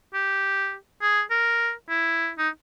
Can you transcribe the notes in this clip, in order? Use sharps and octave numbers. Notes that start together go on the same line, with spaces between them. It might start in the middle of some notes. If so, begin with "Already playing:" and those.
G4
G#4
A#4
E4
D#4